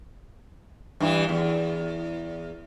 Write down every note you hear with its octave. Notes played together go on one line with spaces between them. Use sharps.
G2 E3
E2